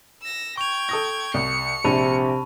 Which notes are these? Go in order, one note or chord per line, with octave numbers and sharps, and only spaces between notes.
E6 A#6
G5 C#6 G#6 F7
A4 D#6 A#6
C2 C#7
A#1 C3 D4 A5 B5